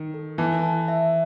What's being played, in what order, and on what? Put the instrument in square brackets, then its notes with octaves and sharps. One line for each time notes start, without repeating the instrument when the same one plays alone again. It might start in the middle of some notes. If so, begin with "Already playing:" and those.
Already playing: [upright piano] D#3
[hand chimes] A4
[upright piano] E3 [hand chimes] A5
[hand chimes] A5
E5